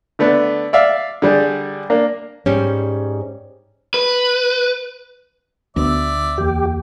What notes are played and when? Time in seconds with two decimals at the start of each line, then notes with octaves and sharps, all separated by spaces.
0.19 D3 A3 B3 D4
0.73 D5 E5 F5
1.22 D3 G3 D4 G#4
1.90 A#3 D4
2.46 G#2 G3 C#4
3.94 B4
5.76 D2 B3 D5 E5
6.38 E2 A#3 G4